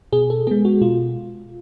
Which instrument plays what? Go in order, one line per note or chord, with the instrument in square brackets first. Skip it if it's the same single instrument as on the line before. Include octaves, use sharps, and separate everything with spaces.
[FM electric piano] B2 G#4
A4
G#3 B3 G#4
F#4
B2 F4